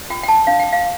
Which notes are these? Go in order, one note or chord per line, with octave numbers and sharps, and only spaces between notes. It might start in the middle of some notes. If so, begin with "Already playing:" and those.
F4 G5
G5
A5
D4 F5
G5
F5